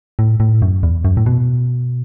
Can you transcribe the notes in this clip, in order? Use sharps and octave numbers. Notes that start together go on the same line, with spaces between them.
A2
A2
F#2
E2
F#2
A2
B2